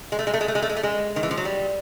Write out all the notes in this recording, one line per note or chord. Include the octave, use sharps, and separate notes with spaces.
G#3
A3
G#3
A3
G#3
A3
G#3
A3
G#3
A3
G#3
D#3
E3
F3
F#3
G3